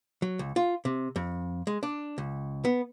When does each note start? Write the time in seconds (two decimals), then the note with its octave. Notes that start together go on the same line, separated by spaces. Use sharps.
0.22 F#3
0.39 C#2
0.56 F4
0.85 C3
1.16 F2
1.67 G#3
1.83 D4
2.18 C#2
2.65 B3